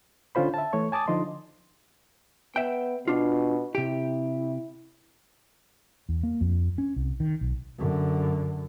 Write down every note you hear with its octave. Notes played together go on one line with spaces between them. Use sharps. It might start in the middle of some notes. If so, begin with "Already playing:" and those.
D3 C#4 F4 C5 B5
E5 A5
E3 A3 C#5 C#6
G#5 A5 D6 D#6 A6
D3 F3 D#4 D#5 C6
B3 E5 G5
B2 D4 F4
C3 E4 G4
E2
A#3
F2
C#4
C2
D#3
B1
F#2 D3